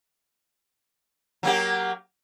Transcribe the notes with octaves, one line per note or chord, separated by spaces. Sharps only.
F#3 A#3 G4